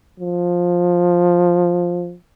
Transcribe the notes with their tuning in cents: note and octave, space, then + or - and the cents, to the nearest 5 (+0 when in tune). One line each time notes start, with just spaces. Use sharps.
F3 +10